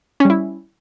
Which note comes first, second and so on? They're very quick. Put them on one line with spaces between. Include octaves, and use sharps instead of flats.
C#4 G3 E4